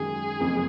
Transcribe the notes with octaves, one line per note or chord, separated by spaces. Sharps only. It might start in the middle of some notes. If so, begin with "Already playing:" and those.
Already playing: F#2 D#3 G#3 G#4
F#1 F2 F3